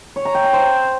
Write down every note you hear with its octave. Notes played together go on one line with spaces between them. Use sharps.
C#5
A#5
G5
A#5
C5